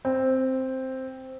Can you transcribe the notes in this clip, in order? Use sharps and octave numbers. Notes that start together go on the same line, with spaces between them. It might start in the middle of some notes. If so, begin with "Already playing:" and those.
C4